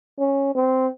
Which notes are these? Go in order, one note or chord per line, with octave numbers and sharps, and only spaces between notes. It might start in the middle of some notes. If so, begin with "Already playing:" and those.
C#4
C4